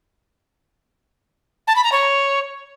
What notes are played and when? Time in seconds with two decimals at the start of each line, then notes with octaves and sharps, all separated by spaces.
1.67 A5
1.76 B5
1.84 A#5
1.92 C#5